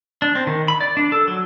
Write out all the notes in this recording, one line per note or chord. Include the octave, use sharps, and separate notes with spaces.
D4
C4
D#3
B5
D5
D4
A4
F#3